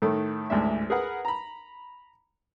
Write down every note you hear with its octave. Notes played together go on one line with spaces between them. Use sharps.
A2 D#3 A3
A1 D2 G#2 D4 E5
G#4 A#4 B4 F#5
A#5 B5